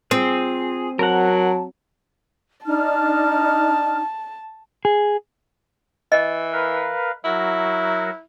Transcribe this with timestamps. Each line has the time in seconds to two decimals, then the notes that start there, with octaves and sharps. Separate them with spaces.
0.11 C4 F4 G#4
0.99 F#3 A#4 F#5 A5
2.66 D4 D#4 A5 F6
4.85 G#4
6.12 E3 D#5
6.52 A#4 B4 F5
7.24 F#3 E4 F#4 A#4